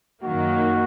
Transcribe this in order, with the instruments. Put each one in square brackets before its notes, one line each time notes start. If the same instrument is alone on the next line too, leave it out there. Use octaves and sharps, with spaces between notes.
[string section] F#2 D#3 A#3 [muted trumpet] F#4